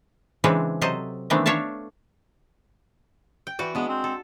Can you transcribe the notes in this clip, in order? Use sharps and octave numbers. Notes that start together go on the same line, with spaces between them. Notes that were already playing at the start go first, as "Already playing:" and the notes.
C#3 E3 G#3 C4 D4
C3 F#3 A4 C5 D#5
D#3 E3 A3 B3 C4 D4
D4 C#5 E5 F5 A5
G5
E3 F#4 D5
G#3 B3 D4
C4
A4